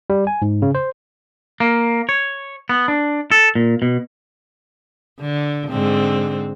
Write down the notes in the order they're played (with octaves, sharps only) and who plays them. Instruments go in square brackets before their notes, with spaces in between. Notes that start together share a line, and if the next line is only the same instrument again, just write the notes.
[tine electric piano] G3
G#5
G#2
C#3
C5
[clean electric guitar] A#3
C#5
B3
D4
A4
A#2
B2
[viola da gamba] D3
G#2 D3 C4